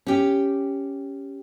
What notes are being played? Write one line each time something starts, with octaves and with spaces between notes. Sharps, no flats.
C#4 G4